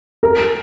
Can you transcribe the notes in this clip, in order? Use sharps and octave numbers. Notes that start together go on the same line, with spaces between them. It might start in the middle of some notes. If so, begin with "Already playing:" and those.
A#4